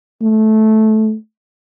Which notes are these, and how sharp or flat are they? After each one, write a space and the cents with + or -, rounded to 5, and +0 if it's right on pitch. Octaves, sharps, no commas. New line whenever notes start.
A3 -15